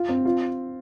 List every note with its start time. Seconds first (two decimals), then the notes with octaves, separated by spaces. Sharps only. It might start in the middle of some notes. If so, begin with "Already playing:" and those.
Already playing: F4
0.09 C4
0.25 F4